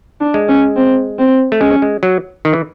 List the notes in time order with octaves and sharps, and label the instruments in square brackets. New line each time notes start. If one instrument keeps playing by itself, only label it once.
[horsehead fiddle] D4
[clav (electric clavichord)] G#3
[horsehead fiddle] C#4
C4
C4
[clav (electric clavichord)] A3
[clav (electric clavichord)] G#3 [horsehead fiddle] C#4
[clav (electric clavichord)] G#3
F#3
D#3
E3